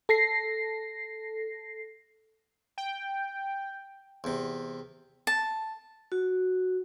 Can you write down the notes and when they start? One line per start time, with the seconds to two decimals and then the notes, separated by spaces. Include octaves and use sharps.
0.09 A4 A#6 C7
2.78 G5
4.24 E2 C3
5.27 A5
6.12 F#4